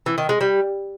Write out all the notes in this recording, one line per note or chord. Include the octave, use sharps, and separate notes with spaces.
E3
D#3
G#3
G3